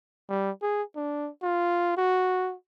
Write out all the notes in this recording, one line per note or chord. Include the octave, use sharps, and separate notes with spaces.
G3
G#4
D4
F4
F#4